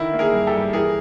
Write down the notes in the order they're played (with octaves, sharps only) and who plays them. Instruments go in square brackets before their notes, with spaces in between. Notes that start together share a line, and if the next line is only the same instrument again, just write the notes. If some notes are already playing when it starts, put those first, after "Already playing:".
Already playing: [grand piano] D3 D#3 E4
A#3
G#4 A#4
G2
G4 A4
G3
E3 G#4 A#4